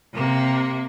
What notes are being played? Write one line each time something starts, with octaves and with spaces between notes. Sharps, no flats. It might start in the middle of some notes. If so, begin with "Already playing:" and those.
C3 A#3